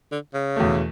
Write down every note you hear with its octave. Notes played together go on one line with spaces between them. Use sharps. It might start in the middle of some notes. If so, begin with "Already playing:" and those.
D3
C#3
E2 B2 A3